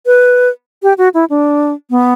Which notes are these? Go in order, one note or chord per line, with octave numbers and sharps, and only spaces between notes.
B4
G4
F#4
E4
D4
B3